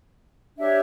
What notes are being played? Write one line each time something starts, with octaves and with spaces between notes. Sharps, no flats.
D4 G4 C#5 E5